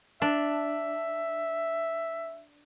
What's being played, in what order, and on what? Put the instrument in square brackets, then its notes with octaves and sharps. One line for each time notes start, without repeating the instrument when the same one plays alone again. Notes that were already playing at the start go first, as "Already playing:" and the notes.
[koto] D4 [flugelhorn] E5